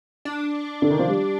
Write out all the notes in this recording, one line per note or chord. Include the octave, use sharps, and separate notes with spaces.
D4
D3
D#3
F3
G3